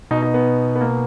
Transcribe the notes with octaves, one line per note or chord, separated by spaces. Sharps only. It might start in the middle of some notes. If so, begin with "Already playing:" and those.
B2 D#4
D#4
B3
B3
A#3